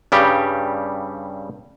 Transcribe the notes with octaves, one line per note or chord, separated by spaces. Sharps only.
G2 C#3 G3 G4